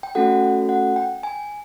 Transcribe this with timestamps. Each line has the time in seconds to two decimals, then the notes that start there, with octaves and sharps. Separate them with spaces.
0.03 G5
0.15 A3 C#4 F#4 A4 F#5
0.69 F#5
0.96 G5
1.23 G#5